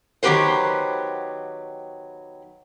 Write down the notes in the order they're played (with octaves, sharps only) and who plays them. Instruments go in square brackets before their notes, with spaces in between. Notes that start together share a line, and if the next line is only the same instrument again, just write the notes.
[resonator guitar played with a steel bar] D#3 F#3 B3 G4 B4 C5